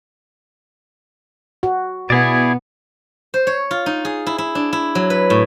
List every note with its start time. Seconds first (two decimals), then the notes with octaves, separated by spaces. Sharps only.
1.63 F#4
2.10 B2 B3 E4 G#4 D5
3.34 C5
3.47 C#5
3.71 F4
3.86 D#4
4.05 G#4
4.27 E4
4.38 E4
4.55 D4
4.73 E4
4.95 F#3
5.10 B4
5.30 A2